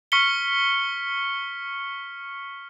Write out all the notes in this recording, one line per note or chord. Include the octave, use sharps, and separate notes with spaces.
C#6 F6 B6 C#7 G7